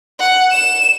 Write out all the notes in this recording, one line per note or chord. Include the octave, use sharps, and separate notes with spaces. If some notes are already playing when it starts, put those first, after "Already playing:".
F#5
E7